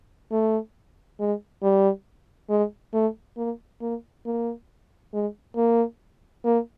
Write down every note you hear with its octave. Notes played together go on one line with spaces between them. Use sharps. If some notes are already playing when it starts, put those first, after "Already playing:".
A3
G#3
G3
G#3
A3
A#3
A#3
A#3
G#3
A#3
A#3